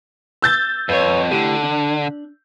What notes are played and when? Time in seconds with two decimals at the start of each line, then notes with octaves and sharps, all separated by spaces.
0.42 E6 G6 A6
0.89 F2 B4 C#5
1.31 A2 D3 G4
1.63 D4